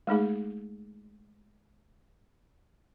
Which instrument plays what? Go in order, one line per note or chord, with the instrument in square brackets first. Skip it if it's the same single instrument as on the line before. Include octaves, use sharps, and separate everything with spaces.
[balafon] G#3 A3 D#4 G#4